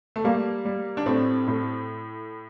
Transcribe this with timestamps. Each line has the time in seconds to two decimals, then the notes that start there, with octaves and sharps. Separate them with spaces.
0.16 A3
0.24 G3 A#3
0.65 G3
0.97 D4
1.06 A2 A3 C4
1.47 A2